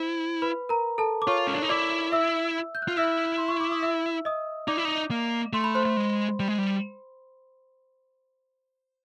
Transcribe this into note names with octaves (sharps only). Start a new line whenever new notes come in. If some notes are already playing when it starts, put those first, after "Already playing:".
Already playing: E4 C5
B4 B5
A#4 A#5
A4 A5
D6
F4 C#5 C#6
C#4
D4
D#4
E4 D5 D6
E5 E6
G6
F#6
F4 F6
E4 E5 E6
C6
C#6
D6
D#6
E5 E6
D#5 D#6
D#4 D5 D6
E4
D#4
A#3
A3 C6
B5
C5 C6
A3
G#3
G3
G#3
G3